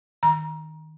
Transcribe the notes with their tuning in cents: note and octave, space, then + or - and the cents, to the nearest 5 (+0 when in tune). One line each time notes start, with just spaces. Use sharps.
D#3 +10 A#5 +25